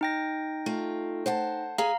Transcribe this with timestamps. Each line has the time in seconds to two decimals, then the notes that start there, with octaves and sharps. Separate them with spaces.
0.01 D#4 G5 A#6
0.66 A3 F4
1.26 C5 F#5 A5
1.78 G#4 F5 G#5 A#5